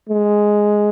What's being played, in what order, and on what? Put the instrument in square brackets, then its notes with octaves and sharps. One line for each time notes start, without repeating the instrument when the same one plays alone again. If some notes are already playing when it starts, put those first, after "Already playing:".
[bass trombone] G#3